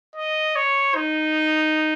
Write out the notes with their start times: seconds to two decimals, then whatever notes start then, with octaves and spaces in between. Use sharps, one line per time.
0.16 D#5
0.56 C#5
0.95 D#4